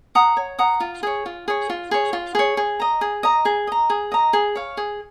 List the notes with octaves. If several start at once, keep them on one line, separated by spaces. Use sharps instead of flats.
F#5 A#5 D#6
C#5
F#5 A#5 D#6
F4
G#4 C#5
F4
G#4 C#5
F4
G#4 C#5
F4
G#4 C#5
G#4
D#5 A#5
G#4
D#5 A#5
G#4
D#5 A#5
G#4
D#5 A#5
G#4
C#5 F5
G#4